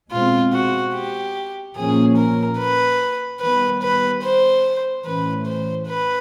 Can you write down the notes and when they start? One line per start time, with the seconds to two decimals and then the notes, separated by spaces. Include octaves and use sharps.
0.11 B2 G#3 C4 F4
0.53 F#4
0.94 G4
1.76 A#2 F3 A#3 C#4 G#4
2.17 A#4
2.58 B4
3.41 D#3 G3 B3 B4
3.82 B4
4.23 C5
5.05 A2 E3 A3 C#4 B4
5.46 C5
5.87 B4